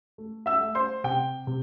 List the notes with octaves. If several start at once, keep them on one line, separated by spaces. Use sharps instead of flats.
A3
E5 E6
A3
C5 C6
C3 G5
C3